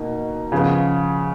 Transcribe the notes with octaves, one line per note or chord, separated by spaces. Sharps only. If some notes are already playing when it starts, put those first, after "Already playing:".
Already playing: B2 A#3 D#4
C#3 F3 B3